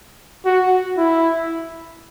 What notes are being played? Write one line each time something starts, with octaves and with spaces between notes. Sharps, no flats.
F#4
E4